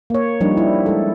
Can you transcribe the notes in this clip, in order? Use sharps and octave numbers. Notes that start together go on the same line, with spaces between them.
A#3 C#5
F3 G3 D4 D#4
E4
G#3 A4